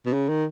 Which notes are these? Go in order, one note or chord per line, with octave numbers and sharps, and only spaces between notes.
B2
C#3
D#3